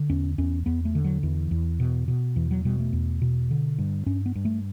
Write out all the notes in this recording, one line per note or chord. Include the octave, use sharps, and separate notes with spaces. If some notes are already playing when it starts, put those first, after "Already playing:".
Already playing: D3
E2 C#4
E2 C#4
E2 B3
A3
D3
F#3
E2 E3
E2
B2
B2
E2 E3
F#3
B2 G3
A3
E2
B2
D3
G2
G2 C#4
B3
G2
A3